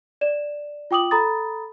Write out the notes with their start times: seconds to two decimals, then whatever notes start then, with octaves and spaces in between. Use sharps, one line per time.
0.21 D5 E7
0.91 F4 G5 D6 D#6 F#7
1.11 A4 A#5 B5 D#6 A6